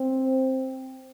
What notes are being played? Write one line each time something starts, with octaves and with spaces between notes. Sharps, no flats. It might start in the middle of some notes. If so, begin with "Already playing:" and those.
Already playing: C4